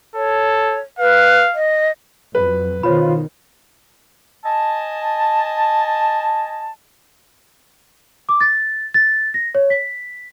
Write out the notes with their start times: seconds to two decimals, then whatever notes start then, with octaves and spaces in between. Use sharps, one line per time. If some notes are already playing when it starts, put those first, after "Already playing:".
0.16 A4 C#5
0.99 B4 F5
1.55 D#5
2.35 F2 F#3 B4
2.83 B2 D#3 F4 C5 C#5 B5
4.44 D#5 G#5 A5
8.29 D6
8.41 A6
8.94 A6
9.34 A#6
9.55 C#5
9.70 B6